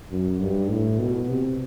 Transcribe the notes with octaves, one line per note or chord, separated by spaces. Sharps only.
F#2
G2
A2
B2
C3